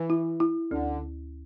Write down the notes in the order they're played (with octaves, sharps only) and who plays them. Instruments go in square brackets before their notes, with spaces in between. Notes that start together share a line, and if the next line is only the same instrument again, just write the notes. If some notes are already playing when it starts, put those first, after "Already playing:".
Already playing: [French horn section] E3
[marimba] E4
E4
[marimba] D2 [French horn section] D3